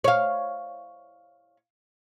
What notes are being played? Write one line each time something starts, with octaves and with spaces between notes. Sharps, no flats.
C#5 F5